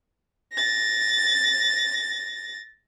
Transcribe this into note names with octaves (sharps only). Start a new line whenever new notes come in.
A6 A#6